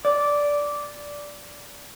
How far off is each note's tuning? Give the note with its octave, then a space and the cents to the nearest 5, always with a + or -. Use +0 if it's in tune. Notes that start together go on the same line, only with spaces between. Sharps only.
D5 -10